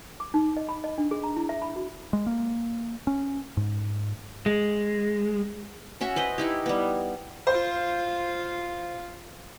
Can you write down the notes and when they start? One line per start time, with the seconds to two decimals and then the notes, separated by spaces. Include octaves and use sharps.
0.20 D6
0.34 D#4
0.57 D#5
0.69 B5
0.84 D#5
0.98 D4
1.11 G#4
1.24 A#5
1.36 E4
1.49 E5
1.62 B5
1.76 F#4
2.13 G#3
2.27 A#3
3.07 C#4
3.57 G#2
4.46 G#3
6.01 C#4 F#4 E5 C#6
6.16 B4 C5 D#5
6.38 D#4 E4 G4
6.66 G3 B3
7.47 F4 C5 F5